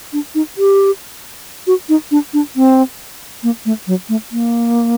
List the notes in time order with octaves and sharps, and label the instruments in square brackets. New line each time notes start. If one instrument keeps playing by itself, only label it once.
[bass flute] D4
D#4
G4
F#4
D#4
D4
D4
C4
A#3
A3
F#3
A3
A#3